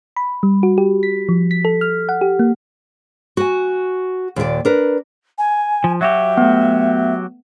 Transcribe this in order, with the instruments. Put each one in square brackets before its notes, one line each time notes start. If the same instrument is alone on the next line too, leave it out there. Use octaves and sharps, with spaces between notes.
[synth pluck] B5
G3
F#4
G4
B6
F3
B6
A4
F6
F#5
G4
A#3
[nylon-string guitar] F#4 G#5
D#2 A#2 G#4 D5
D4 A#4 B4
[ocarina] G#5
[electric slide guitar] F3
[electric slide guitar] F#3 F#4 G4 [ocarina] E5
[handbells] A3 B3